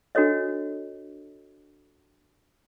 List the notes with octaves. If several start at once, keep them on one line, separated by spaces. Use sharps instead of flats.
D4 F#4 A4 C#5 D#5